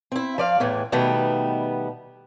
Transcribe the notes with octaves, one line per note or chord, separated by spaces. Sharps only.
C4 E4
F3 D5 F5
E2 A2 E3
B2 D#3 G3 A3 B3